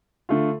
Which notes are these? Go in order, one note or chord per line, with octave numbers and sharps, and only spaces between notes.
D3 A3 F4